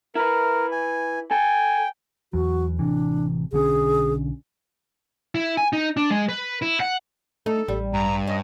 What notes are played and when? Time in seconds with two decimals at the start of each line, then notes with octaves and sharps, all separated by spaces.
0.15 E4 A#4 B4
0.72 G#5
1.31 A4 G5 G#5
2.33 E2 F#3 F#4
2.79 A1 C3 E3 D4
3.53 B1 D3 C#4 G#4
5.35 E4
5.57 G#5
5.73 D#4
5.97 D4
6.10 G#3
6.29 B4
6.62 E4
6.80 F#5
7.46 A3 D#4 A4
7.68 A1 G3
7.93 G2 A#5
8.27 C#4 D#5